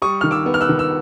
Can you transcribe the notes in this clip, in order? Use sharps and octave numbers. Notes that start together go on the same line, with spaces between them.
G3 C#6 D#6
D#3 F6
D6 E6
B3
F6
E6 F#6
D#3
E6